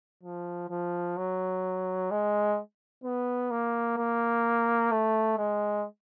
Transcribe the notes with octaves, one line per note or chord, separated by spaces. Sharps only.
F3
F3
F#3
G#3
B3
A#3
A#3
A3
G#3